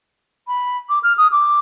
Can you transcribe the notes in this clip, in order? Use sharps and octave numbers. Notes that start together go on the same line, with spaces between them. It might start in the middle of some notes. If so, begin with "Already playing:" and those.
B5
D6
F6
D#6
D6